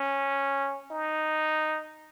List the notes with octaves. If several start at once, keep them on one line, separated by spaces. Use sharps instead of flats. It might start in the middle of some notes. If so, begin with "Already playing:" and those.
Already playing: C#4
D#4